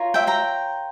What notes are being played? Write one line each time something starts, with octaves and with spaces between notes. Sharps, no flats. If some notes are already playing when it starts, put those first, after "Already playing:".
Already playing: F4 A#4 C#5
E5 G5
G5 A#5